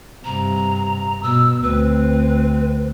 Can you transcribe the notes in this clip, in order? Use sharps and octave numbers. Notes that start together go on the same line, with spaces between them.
G2 C3 A#5
B2 E6
D2 C4 B4